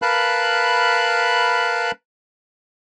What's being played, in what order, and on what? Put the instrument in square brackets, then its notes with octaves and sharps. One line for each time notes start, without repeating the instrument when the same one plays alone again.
[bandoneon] A#4 B4 F5 A5 B5 F#6